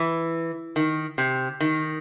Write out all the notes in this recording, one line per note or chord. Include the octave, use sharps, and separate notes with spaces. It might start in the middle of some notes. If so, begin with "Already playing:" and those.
Already playing: E3
D#3
C3
D#3